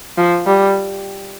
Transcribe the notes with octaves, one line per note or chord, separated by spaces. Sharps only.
F3
G3